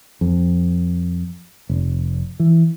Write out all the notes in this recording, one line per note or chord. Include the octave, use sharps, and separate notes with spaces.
F2
F1
E3